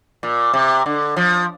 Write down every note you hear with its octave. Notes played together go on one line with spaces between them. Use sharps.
A#2
C3
D3
F3